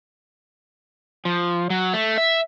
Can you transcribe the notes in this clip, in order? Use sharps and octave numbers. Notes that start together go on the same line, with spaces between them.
F3
F#3
A3
E5